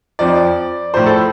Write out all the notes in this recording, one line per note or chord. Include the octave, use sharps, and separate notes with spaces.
F2 F3 D5
A2 F3 C5
A4